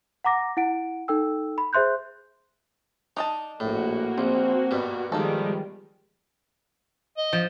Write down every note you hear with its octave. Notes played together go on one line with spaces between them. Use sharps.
F#5 A#5 D6 A#6
E4 F#5 D7
D#4 A4 G5 E6
B5
G#4 C5 E5 C6 F#6 G6
D4 D#4 D#5 A5
A#1 A2 A#3 F#4
A#1 F3 C4
G2 B2
D#3 F3 G3 G#3 A#3 D#4 A4
D#5
F3